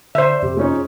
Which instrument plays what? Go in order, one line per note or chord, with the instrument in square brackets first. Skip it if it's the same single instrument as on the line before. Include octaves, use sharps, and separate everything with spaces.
[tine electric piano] D3 [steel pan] C5 E5 [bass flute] D5
[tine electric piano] F2 C3 [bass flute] G4
[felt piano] G#3 C#4 D#4 [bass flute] F4